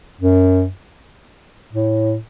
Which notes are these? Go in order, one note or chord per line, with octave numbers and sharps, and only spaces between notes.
F#2
A2